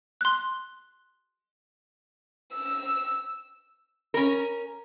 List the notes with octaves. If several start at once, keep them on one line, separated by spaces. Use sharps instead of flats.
C6 F#6
E6
C#4 A#4